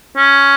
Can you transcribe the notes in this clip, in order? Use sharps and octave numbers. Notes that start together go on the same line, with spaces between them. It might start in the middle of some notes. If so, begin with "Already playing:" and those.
C#4